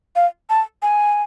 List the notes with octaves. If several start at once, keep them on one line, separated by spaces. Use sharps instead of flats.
F5
A5
G#5